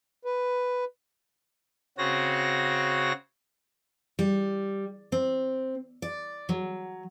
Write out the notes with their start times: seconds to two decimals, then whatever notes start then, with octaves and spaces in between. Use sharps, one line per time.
0.25 B4
1.98 C#3 C4 C#4 F#4 A#6
4.19 G3
5.12 C4
6.02 D5
6.49 F#3